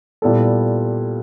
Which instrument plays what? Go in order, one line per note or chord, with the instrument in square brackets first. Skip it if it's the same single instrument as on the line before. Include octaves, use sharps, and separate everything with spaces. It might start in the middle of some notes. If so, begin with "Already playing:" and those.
[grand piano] A#2 G3 B3 E4 A4